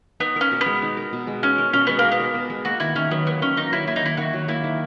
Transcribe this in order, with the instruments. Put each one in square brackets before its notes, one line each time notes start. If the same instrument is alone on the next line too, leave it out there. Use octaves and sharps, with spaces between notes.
[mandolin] B3 [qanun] D#4
[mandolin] C#4 [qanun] A#4
[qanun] B2
[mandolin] B3
[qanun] G#3
D#4
A#4
B2
G#3
[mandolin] C#4 [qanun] D#4
[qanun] A#4
[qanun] B2 [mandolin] C#4
[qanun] G#3 [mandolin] B3
[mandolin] A#3
[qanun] D#4
[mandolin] B3
[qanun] A#4
B2
G#3
[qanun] A#3 [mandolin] F#4
[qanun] D#3 [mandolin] E4
[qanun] D#3 [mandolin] C#4
[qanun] F#3 [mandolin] B3
[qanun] A#3 [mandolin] B3
[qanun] D#3 [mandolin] C#4
[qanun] D#3 [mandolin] D#4
[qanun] F#3 [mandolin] E4
[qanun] A#3 [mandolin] E4
[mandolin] D#4
[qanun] D#3 [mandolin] E4
[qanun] D#3 [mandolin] F#4
[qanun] F#3
[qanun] A#3 [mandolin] E4
[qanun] D#3